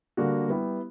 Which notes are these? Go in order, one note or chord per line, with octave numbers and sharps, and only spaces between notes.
D3 G3 A#3 D4 F#4
G3 B3 E4 G4